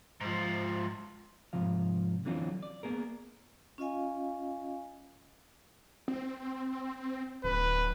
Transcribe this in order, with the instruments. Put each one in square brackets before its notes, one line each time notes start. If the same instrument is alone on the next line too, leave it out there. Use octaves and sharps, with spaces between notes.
[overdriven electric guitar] G#2 F3
[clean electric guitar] G#2 C3 F3 F5
D3 E3 F#3 C4 C#4 F4
D5
A#3 B3 G#4 A#4
[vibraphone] C#4 F4 D#5 F5 G#5
[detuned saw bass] C4
[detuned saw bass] D1 [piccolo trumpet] B4